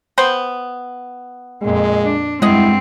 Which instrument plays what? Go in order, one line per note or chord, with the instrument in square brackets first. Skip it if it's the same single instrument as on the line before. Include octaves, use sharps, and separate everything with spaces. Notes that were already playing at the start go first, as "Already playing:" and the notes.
[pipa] B3 C5 G5
[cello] F2 A#2 [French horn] G#3
[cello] D4
[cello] G2 C4 [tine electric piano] G#3 [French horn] E4 [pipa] D#5 F#5